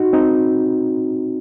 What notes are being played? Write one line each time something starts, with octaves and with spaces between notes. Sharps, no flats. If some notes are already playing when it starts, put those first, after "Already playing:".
Already playing: D#4 F#4
C4 D#4